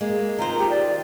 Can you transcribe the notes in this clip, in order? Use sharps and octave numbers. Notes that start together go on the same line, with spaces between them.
G#3 A#3
D#3 F4 C5 A#5
G4
D5